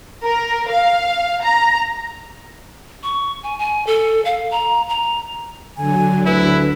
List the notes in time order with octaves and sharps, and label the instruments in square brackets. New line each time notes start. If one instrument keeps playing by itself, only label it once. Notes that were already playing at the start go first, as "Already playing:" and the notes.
[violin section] A#4
F5
A#5
[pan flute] C#6
G#5
G#5
A4
F5
A#5
A#5
[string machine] D3 F#3 [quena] G#5
[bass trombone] D2 [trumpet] E4 [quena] B4